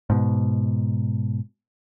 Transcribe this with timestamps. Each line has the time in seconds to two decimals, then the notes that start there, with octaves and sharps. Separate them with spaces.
0.10 G#2 B2